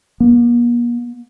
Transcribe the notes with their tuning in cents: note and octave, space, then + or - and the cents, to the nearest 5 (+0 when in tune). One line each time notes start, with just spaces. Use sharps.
A#3 +45